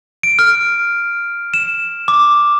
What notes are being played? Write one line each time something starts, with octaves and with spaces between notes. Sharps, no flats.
D7
F6
E7
D6